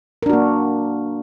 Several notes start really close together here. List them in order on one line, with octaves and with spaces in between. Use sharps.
A#4 D4 F#4 A#3